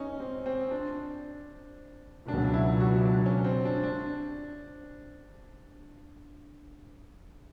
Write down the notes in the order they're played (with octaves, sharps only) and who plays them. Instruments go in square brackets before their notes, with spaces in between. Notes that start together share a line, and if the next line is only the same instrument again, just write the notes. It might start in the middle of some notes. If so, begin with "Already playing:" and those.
Already playing: [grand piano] C#4 D#4
C4
C4
D4
[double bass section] C#2 B2 F#3 [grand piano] D4
[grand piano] E4
F#4
D4
C#4
C4
D4
D4